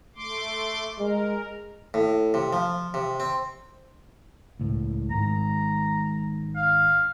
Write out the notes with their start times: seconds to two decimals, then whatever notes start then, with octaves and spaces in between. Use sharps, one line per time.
0.16 A3 C6 D6
0.99 G#3 A#4
1.94 A2
2.34 C3
2.53 F3
2.94 C3
3.20 C4
4.60 C#2 A2
5.11 G#1 G#2 G#3 A#5
6.56 F5